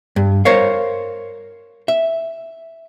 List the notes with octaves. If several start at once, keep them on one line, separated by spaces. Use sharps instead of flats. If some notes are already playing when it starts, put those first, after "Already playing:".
G2
A#4 C5 C#5 F5
E5